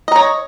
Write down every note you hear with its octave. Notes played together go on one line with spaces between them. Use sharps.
C#5 D#5 A#5